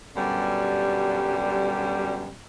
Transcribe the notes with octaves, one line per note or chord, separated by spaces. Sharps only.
F#2 B2 D3 G3